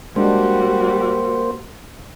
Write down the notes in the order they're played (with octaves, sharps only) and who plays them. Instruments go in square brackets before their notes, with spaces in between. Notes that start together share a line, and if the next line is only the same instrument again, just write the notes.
[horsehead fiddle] G3 F#4 [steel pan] G#3 D4 [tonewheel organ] A#3 C5